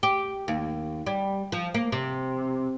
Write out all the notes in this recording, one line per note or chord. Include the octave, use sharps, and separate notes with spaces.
G4
D#2
G3
F3
A#3
C3